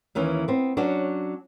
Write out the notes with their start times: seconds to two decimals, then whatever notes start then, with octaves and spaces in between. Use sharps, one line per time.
0.15 D#2 D#3 E3 C#4
0.48 B3 C4
0.77 F#3 C#4 D4 F#4